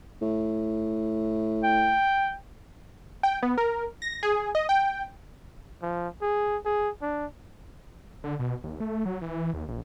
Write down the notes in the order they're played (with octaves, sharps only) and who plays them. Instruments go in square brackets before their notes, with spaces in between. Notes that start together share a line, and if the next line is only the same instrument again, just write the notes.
[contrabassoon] A2
[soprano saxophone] G5
[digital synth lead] G5
B3
A#4
A#6
G#4
D#5
G5
[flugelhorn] F3
G#4
G#4
D4
[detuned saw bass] D3
B2
D#2
A3
F#3
E3
D#2
A#1